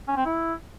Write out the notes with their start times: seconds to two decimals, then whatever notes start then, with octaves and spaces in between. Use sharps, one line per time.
0.08 C#4
0.17 C4
0.26 E4